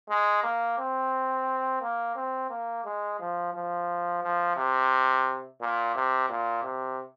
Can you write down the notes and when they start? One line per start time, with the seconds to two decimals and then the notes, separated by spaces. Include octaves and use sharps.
0.10 G#3
0.43 A#3
0.78 C4
1.82 A#3
2.16 C4
2.50 A#3
2.85 G#3
3.19 F3
3.54 F3
4.23 F3
4.57 C3
5.61 A#2
5.96 C3
6.30 A#2
6.63 C3